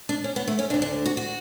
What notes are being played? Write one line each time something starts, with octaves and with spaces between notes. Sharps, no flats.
D4
C#4
B3
A3
C#4
D2 D3 D4
D4
F#4
F#4